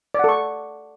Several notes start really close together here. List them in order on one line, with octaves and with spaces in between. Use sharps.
D5 F#5 A4 C#6